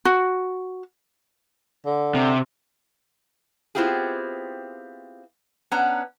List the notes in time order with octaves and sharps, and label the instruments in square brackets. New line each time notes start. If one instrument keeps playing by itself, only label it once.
[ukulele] F#4
[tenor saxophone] D3
[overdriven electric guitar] C3
[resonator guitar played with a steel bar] B3 C4 E4 F4 G4 G#4
B3 C#4 D4 F#5 A#5